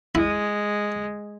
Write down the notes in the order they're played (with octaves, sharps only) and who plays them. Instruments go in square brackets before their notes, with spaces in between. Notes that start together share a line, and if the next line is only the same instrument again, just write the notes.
[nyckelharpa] G#3 [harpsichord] E4